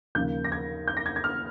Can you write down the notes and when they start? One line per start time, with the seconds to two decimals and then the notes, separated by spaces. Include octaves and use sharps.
0.15 D#2 C#3 F3 A#3 G6
0.44 A#6
0.52 G#6
0.88 G6
0.97 A#6
1.06 G#6
1.16 G#6
1.24 F6